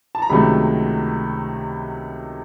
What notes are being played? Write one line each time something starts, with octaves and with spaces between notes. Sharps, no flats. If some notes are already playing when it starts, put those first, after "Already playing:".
A5
A#5
C#2 C3 D#3 F#3 A3 B5